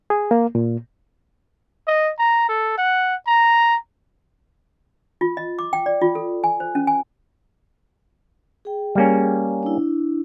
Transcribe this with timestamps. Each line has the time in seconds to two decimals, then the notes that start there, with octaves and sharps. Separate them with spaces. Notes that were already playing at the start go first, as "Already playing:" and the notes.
0.10 G#4
0.31 A#3
0.55 A#2
1.88 D#5
2.18 A#5
2.49 A4
2.78 F#5
3.27 A#5
5.21 F4
5.37 D#5
5.59 D6
5.73 G5
5.86 D5
6.01 F4
6.15 A4
6.44 G#5
6.60 C5
6.75 C#4
6.87 G#5
8.65 G#4 G5
8.95 G3 A#3 C#4
9.63 D4 E4